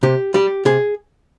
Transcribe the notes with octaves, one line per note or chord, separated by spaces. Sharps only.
C3 G4
G3 G4
C3 G#4